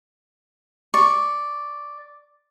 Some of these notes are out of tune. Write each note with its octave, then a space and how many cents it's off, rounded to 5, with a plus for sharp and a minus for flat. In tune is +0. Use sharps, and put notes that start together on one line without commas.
D5 +0 C#6 +0